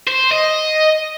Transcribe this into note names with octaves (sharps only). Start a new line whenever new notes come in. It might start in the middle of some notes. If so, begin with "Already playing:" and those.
C5
D#5